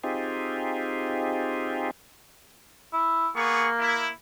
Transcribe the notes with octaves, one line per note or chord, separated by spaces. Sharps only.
C4 D#4 F4 G4 G#4
E4
A#3 B3 G#4 C#6
E4